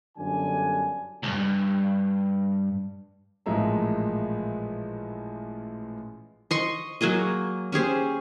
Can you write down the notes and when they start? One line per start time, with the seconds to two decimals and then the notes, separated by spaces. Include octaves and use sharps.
0.17 G1 F#2 D3 D4 G#5
1.23 C#2 G2
3.46 A1 A#2 F3 G#3 E5 A#5
6.51 D#5 C6 C#6
7.01 F#3 A#3 G#4 D#5
7.72 C#4 G4 G#4 C5